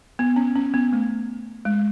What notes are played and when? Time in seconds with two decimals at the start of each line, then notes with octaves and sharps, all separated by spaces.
0.19 B3
0.36 C#4
0.55 C#4
0.74 B3
0.93 A3
1.65 G#3